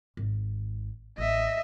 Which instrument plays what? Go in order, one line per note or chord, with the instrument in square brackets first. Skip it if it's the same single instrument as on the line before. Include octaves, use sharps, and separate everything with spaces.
[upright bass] G#1
[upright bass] A1 [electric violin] D#5 E5